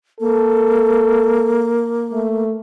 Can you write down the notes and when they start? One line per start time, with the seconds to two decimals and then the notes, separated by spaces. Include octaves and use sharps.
0.20 A#3 A4
2.13 A3